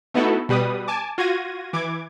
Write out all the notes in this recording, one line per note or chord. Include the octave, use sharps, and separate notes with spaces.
A3 B3 D#4 E4 F#4 A4
B2 G3 B4 D#6
G#5 A5 D6
F4 F#4 G#6 A#6 D#7
E3 D6 G#6